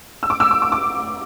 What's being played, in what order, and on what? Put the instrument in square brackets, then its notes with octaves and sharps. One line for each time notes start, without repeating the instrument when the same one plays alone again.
[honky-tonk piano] E6
D6
E6
D6
D6
D6